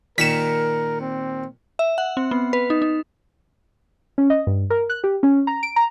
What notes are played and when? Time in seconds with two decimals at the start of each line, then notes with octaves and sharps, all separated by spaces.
0.18 A#2 D#3 A#4 C#6 B6 E7
1.00 C4
1.79 E5
1.98 F#5
2.17 C4
2.31 B3
2.53 B4
2.70 D#4
2.82 D#4
4.18 C#4
4.30 D#5
4.47 G2
4.70 A#4
4.90 F#6
5.04 G4
5.23 C#4
5.47 A#5
5.63 D7
5.76 A#5